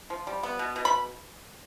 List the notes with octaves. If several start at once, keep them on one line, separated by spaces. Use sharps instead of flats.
F3
G3
B3
B2
B2
B5